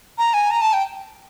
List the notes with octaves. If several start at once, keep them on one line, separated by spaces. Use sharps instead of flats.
A#5
G#5
A#5
A5
G5